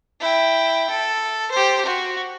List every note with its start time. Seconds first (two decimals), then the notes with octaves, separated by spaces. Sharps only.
0.20 E4 G5
0.90 A4
1.51 G4 C5
1.85 F#4